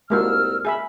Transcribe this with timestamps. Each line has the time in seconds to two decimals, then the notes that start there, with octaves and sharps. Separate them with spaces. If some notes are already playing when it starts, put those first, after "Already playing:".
0.10 C2 G#3 A#3 F#4 E6 F6
0.65 G#4 E5 B5